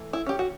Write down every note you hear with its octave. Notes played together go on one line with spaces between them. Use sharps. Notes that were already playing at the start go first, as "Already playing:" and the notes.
Already playing: E3 A3
E4
C#4 G4
F#4